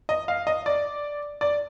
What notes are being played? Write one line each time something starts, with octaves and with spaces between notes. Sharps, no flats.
D#5
F5
D#5
D5
D5